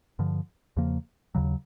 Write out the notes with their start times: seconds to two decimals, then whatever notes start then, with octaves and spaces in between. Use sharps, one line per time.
0.19 G2 D3 F3
0.77 E2 C#3 F3 A#3
1.35 D#2 C#3 F#3